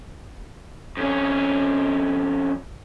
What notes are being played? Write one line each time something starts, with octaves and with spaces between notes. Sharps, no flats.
F2 C#4